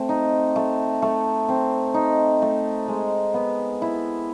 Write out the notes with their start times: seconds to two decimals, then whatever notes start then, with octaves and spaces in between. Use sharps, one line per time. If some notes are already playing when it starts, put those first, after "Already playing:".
Already playing: A3 C4
0.09 D#4
0.56 A3
1.02 A3
1.49 C4
1.94 D#4
2.42 A3
2.88 G#3
3.34 B3
3.82 E4